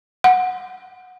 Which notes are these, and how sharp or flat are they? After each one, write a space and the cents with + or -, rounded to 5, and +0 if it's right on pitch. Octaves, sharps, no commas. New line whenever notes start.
F#5 -10